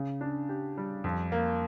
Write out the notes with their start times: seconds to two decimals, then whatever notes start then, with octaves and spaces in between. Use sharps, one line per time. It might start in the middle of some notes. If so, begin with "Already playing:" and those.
Already playing: C#3
0.21 D4
0.49 G4
0.78 G3
1.04 F2
1.32 A#3